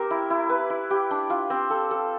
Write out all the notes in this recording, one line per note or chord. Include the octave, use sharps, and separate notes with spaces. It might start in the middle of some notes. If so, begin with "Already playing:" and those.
Already playing: C4 G4 A#4
E4
E4
B4
E4
G4
D4
F4
C4
A4
A4